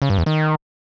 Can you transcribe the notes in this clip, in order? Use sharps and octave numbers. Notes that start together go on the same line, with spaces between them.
C#3
G2
E2
D#3